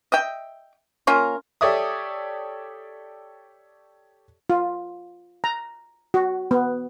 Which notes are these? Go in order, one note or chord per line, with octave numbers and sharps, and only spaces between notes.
D#5 E5 G5
A#3 C#4 F4 A#4
G4 A4 C#5 D5 E5 D#6
F4
A#5
F#4
B3